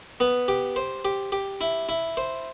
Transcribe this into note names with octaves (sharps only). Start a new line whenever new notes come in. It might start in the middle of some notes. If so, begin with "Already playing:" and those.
B3
G4
C5
G4
G4
E4
E4
C5